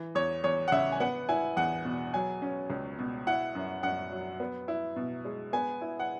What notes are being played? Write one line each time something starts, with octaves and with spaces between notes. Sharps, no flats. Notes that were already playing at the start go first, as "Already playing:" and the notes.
Already playing: E3
E2 C#5
E2 C#5
F#5
C#3 E5
G#5
B3 F#5
E4 G#5
E2 F#5
B2
F#3 G#5
C#4
C#2
B2
E4 F#5
F#2
F#2 F#5
F#3
B3
E4
B2
G#3
B3 G#5
E4
F#5